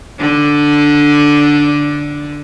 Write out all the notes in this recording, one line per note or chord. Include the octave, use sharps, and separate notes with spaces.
D3 D4